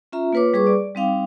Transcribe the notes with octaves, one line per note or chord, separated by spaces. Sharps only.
C#4 F4 E5 A#5
A#3 F4 B4 C#5 D6
G3 G#4 B4 C#6 D6
D5
G3 C4 D#4 F5 G5 D6